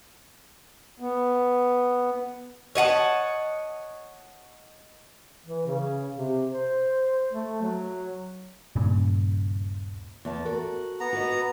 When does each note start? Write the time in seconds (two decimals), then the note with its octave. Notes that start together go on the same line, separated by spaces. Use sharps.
1.00 B3
2.75 C#5 D#5 F#5 A5
5.46 E3
5.66 C#3
6.16 C3
6.51 C5
7.33 A3
7.62 F#3
8.76 D#1 G2 A#2 C#3
10.25 E2 A5
10.45 F#4 A4 A#4
11.00 B3 A#5
11.13 F#4 B4 D#5